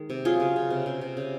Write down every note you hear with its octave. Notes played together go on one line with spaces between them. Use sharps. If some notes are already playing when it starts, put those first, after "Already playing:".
Already playing: D#3 G#3
C3
F#3 F4 G#4
C#3
C#3
C3
C3
C3
C#3